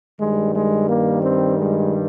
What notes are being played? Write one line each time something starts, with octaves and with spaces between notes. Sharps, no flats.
G2 D#3 G3 G#3
G#3
A#3
C4
G#3